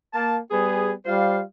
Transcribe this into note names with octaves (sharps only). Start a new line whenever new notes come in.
A#3 A5
G3 B3 G#4
G3 F4 C5 F5